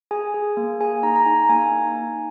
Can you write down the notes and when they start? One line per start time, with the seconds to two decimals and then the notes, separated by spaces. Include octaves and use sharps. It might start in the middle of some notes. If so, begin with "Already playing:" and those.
0.11 G#4 G#5
0.34 G#4
0.57 A#3
0.81 G#4 G#5
1.03 D#4 A#5
1.16 A#5
1.25 D#4 G#5
1.49 A#3 G#5
1.72 D#4
1.95 D#4